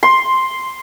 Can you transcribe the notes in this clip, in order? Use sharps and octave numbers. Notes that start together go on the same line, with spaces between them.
C6